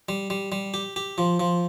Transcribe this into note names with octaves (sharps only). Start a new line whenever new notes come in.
G3
G3
G3
G4
G4
F3
F3